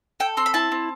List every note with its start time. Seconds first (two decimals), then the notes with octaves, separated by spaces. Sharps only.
0.20 A4 G5
0.37 C4 C6
0.46 B5
0.54 E4 A5
0.72 C4